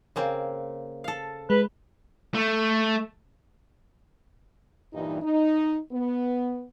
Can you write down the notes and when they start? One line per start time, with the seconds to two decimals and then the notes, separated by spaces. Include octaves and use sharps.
0.16 C#3 A#3 C4
1.04 A4 F5
1.50 G#3 B4
2.35 A3
4.93 G2 A#2 E3 G3 D#4
5.22 D#4
5.92 B3